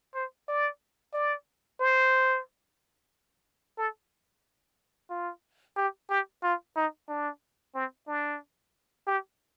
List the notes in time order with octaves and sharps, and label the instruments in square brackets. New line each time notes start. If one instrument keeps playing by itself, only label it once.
[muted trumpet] C5
D5
D5
C5
A4
F4
G4
G4
F4
D#4
D4
C4
D4
G4